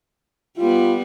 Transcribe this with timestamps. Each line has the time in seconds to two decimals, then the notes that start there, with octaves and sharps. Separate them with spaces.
0.57 G3 B3 F4